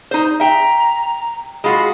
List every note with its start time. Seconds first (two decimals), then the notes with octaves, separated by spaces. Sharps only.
0.11 D#4 C5
0.40 E5 G5 A#5
1.64 G#3 F4 F#4 B5